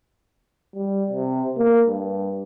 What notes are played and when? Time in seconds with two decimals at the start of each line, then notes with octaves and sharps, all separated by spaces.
0.75 G3
1.10 C3
1.57 A#3
1.87 G2